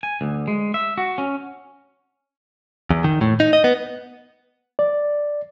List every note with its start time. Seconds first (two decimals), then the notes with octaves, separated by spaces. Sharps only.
0.03 G#5
0.21 D2
0.48 G#3
0.74 E5
0.98 F#4
1.18 C#4
2.90 E2
3.04 D#3
3.21 A2
3.40 D#4
3.53 D#5
3.64 B3
4.79 D5